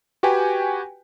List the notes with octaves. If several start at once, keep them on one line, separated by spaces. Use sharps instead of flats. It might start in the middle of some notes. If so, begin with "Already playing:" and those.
F#4 G4 B4 G5 G#5